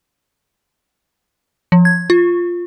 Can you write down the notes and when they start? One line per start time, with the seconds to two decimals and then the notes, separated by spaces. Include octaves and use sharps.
1.72 F3
1.85 G#6
2.10 F4